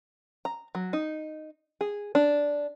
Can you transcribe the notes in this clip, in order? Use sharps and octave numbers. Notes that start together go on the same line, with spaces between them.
A#5
F#3
D#4
G#4
D4